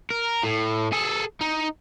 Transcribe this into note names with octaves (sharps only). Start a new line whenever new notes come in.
A#4
A2
G#4 A4
D#4